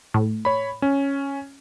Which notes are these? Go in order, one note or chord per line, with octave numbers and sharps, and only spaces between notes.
A2
C#5 B5
C#4